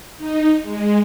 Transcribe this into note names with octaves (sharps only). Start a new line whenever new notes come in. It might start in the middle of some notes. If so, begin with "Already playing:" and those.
D#4
G#3